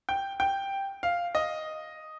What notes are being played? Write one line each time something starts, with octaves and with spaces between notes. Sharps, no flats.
G5
G5
F5
D#5